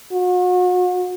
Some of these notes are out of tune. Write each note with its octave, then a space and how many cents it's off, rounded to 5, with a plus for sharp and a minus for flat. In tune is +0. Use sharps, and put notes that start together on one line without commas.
F#4 -40